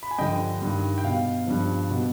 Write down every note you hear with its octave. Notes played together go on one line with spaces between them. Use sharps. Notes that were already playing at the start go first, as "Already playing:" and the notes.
B5
G#5
G2 D3 F3 D#5 G5
G2 D#3
G5
B2 F5
G2 F3
B2